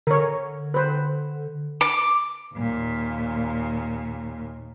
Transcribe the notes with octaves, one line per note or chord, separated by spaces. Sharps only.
D3 A#4 C#5
B4 C5
D6
D#2 A#2